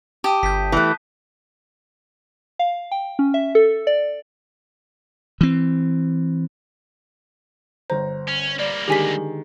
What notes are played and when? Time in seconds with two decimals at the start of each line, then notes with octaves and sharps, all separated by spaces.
0.24 G4 A5 D#6 D#7
0.43 G1 G6 B6
0.72 E3 A3
2.59 F5
2.92 G5
3.19 C#4
3.34 E5
3.55 A4
3.87 D5
5.41 E3 C4
7.90 G1 C5 A#5
8.28 C#4
8.59 G3 A#3 D5
8.88 D3 D#3 G#3 G4 G#5 B6